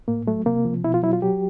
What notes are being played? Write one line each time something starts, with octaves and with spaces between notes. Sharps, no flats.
A2 A#3
F#3 A3
C3 A#3
F3
B2 E4
F4
F#3 E4
F4
F#3 G4